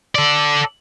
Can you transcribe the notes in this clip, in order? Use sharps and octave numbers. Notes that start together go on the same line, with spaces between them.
A4 D5